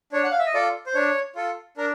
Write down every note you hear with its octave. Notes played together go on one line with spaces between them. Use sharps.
D4 C#5
F#5
F5
E5
D#5
F4 A4 D5
C5
D4 C#5
F4 A4
D4 A#4